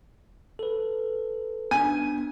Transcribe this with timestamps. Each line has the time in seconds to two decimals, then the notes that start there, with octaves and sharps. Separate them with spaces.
0.59 A4 B4
1.71 B3 D4 G#5